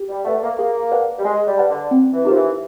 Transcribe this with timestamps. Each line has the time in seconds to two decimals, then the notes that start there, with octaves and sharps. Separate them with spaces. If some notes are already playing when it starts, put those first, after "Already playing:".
Already playing: G4
0.09 G3
0.25 A3 B4 D5 F#5
0.42 A#3
0.58 A#3 G#4
0.92 B4 D5 F#5 A5
1.19 G3
1.24 G#3 G#4
1.47 G3
1.58 B4 D5 F#5 A5
1.70 D3
1.91 C4
2.13 E3
2.25 F3 D#4 G4 A#4
2.35 E3